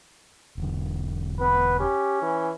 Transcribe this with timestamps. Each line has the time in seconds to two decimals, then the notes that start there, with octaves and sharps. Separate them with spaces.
0.57 E1 D3
1.41 B3 B4
1.80 C#4 G4
2.22 E3